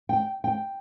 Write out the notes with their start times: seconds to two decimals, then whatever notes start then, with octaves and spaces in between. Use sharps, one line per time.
0.09 G5
0.44 G5